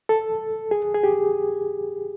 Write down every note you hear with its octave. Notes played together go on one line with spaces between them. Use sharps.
A4
G#4
G#4
G4